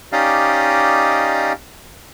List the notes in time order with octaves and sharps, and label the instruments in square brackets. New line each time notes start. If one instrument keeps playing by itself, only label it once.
[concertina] C#4 D#4 G4 D5 D#5 F5